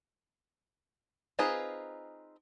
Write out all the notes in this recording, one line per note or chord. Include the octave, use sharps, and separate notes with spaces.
C4 D#4 F4 G#4 B4